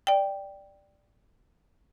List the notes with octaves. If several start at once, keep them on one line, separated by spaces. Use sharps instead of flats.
D5 G5